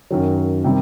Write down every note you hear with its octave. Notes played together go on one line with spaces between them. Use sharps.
F#2 D#3 F#3
C3 D#3 G3